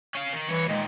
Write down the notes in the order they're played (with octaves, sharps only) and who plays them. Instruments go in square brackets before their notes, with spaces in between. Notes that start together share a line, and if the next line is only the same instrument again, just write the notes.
[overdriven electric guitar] C#4 F5
D#3
[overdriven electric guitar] G2 C#5 [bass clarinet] E3
[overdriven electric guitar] A#2 D#3 [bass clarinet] G#3